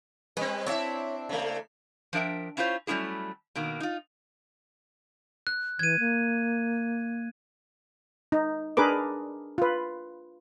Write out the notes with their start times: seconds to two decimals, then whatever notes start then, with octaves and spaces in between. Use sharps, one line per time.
0.37 G3 C4 B4
0.66 C4 D4 E4 C#5 E5
1.29 C#3 A3
2.13 F3 D4 A#4 E5 G5
2.57 C#4 E4 F4 A#4 C5 C#5
2.87 F#3 G3 A3 C#4 E4 G#4
3.55 B2 D#3 A#3
3.80 D#4 F4
5.47 F#6
5.79 E3 G#6 D#7
5.99 A#3
8.32 D#4
8.77 D4 G#4 A#4 B4 D6
9.58 F4 B4